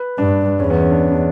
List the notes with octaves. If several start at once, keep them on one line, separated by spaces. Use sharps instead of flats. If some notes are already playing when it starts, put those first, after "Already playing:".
Already playing: B4
G2 D4
E2 C#4
B3
C#4
D4
C#4
D4